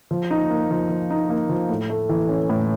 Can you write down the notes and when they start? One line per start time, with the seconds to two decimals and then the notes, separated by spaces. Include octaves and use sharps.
0.11 F3
0.31 D#4
0.50 A#3
0.71 F3
0.90 F3
1.10 D#4
1.30 A#3
1.49 F3
1.69 A2
1.90 A3
2.09 E3
2.28 C#4
2.49 A2